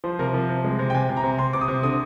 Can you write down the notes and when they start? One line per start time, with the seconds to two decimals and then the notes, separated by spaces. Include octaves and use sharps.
0.04 F3 C5
0.19 C3 A#4
0.34 F3
0.49 C3
0.64 G#3
0.79 C3
0.90 G5
0.94 C3 G#5
1.09 C3
1.17 A#5
1.23 C3
1.39 C3 C6
1.53 C3 D6
1.61 D#6
1.68 C3
1.83 D3 D#6